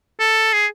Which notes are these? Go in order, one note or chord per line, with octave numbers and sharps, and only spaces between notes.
A4
G#4